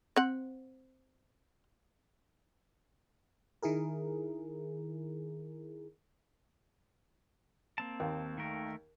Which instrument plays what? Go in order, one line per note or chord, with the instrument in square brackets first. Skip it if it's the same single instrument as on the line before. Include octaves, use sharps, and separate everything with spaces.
[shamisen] C4 F#5
[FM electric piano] D#3 E4 G#4 A#4
[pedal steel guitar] A#3 C4 A5
[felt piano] D#2
[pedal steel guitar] D#3 A3 A#4